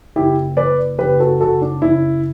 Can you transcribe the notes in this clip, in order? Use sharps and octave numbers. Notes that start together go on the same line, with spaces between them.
F#1 E4 G4
F#1 B4 D5
F#1 G4 B4
F#4 A4
F#1 F#4 A4
D4
C#3 E4